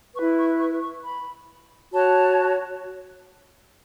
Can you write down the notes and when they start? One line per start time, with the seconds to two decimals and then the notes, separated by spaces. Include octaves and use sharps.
0.16 E4 B4 C#6
0.38 C#6
0.60 C#6
0.81 C#6
1.05 B5
1.93 F#4 C#5 A5